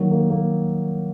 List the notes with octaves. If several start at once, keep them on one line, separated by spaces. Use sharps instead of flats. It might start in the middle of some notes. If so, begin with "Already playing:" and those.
Already playing: D#3 F#3 A#3
A#3
A#3